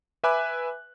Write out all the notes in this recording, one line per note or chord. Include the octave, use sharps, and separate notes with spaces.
B4 E5 G#5 B5 D6 F#6